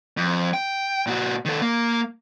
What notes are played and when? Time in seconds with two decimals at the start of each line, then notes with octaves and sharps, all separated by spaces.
0.17 F2
0.54 G5
1.07 A#2 F#4
1.45 D#3 A4
1.62 A#3